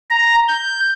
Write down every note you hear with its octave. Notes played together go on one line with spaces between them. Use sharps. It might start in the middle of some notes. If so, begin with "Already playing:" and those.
A#5
G6